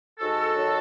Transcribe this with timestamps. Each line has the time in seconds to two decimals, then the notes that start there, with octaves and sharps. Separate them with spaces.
0.19 G#2 F#4 A4
0.54 D#3 F#3